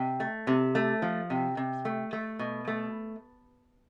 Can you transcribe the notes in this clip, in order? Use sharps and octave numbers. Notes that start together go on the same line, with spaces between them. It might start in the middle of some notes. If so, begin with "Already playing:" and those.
Already playing: C3
A3
C3
A3
F3
C3
C3
A3
A3
B2
A3